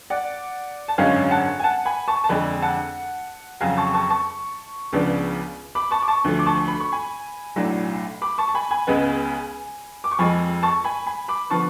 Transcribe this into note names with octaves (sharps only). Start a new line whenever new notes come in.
D5 F#5
A5
G#1 F#2 D3 G#3 C#4 F5 G#5
F#5 A5
G#5
F#5 A5
G#5 B5
A5 C#6
A5
F2 D3 G#3 D4 G#5 B5
F#5 A5
F2 C#3 F#3 F5 G#5
A5 C#6
A5 C#6
A5 C#6
C#2 C#3 F3 B3 D4
B5 D6
A5 C#6
D6
A5 C#6
D2 D3 F3 A3
D6
A5 C#6
B5
C#6
G#5 B5
B1 A2 F#3 A3 D4
B5 D6
A5 C#6
A5
G#5 B5
G#5 B5
C#2 C#3 G#3 B3
D6
C#6
F2 F3 G#3 G#5 B5
A5 C#6
G#5 B5
G#5 B5
B5 D6
D3 F3 B3 A5 C#6